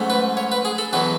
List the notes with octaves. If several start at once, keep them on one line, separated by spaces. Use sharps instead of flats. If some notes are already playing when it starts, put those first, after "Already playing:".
Already playing: G#2 F#3 A3 C#4
B4
C#5
B4
G#4
A4
E2 B2 F#3 B4